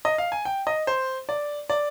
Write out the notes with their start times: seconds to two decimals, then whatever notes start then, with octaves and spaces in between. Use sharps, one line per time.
0.05 D#5
0.18 F5
0.32 G#5
0.45 G5
0.67 D#5
0.87 C5
1.29 D5
1.70 D5